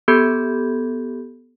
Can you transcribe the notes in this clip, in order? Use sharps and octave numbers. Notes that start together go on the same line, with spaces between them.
B3 G4 A4 B5 G6 G#6